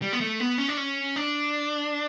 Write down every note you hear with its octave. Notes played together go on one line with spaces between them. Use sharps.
G3
B3
A3
B3
C#4
D4
C#4
D4